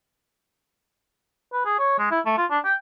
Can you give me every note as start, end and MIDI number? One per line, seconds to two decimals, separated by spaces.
1.53 1.62 71
1.65 1.78 68
1.79 1.97 73
1.98 2.10 56
2.11 2.20 64
2.25 2.33 57
2.37 2.45 65
2.50 2.59 62
2.65 2.74 79